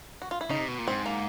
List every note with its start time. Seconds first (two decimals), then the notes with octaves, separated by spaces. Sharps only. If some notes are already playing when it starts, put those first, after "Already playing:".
0.22 F#4
0.31 F4
0.41 E4
0.50 C#3 D#4
0.59 C3
0.68 B2
0.78 A#2
0.88 G#2 C4
1.06 A#3